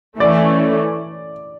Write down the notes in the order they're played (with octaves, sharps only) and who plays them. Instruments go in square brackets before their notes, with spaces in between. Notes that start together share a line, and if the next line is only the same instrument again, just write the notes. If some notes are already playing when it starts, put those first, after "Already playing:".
[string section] E3 A3 C#4 [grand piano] D5